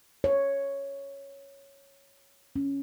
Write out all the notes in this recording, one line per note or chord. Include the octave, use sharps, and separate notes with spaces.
C#5
C#4